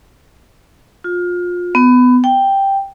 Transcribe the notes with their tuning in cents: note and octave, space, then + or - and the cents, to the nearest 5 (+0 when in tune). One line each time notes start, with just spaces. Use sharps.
F4 +25
B3 +20
G5 +0